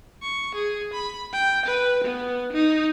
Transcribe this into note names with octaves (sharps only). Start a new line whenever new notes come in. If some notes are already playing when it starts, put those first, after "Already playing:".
C#6
G#4
B5
G5
B4
B3
D#4